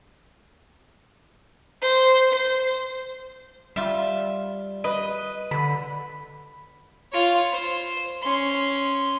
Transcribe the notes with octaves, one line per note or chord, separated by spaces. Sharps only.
C5
C5
G3 F4 E5
B4 D#5
D3 B5
F4 C#5
C5
C#4 C6